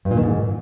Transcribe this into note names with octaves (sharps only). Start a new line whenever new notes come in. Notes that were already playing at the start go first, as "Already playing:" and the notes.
G2
A#2
D#3
G#2